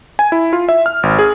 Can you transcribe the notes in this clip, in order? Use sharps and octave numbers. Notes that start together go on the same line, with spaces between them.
G#5
E4
F4
E5
F6
G#1
G#4